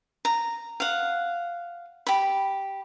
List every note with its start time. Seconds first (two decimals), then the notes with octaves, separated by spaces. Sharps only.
0.25 A#5
0.80 F5 F#5
2.07 G4 B5